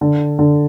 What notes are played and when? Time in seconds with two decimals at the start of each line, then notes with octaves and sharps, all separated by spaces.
0.01 D3
0.39 D3